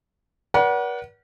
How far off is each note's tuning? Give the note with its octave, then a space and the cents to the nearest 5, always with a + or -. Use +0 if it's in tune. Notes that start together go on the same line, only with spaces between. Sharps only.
B4 -45 D5 -35 F#5 +15